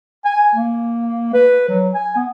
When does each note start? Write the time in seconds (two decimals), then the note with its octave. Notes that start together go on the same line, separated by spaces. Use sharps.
0.25 G#5
0.55 A#3
1.33 B4
1.69 F#3
1.94 G#5
2.16 B3